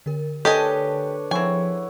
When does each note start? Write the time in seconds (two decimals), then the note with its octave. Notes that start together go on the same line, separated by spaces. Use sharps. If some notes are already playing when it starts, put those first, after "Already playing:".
0.06 D3 A#4
0.45 D4 G4 A4 B4 C#5 D#5 G#5
1.31 F3 C4 E4 G#4 C#5 F#5 G#5